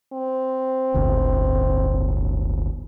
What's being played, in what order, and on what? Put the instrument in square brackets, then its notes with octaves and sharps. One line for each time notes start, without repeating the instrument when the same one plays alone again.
[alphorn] C4
[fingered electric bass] D1 G1 D2